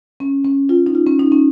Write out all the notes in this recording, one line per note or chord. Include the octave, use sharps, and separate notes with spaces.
C#4
C#4
F4
D#4
F4
C#4
D#4
C#4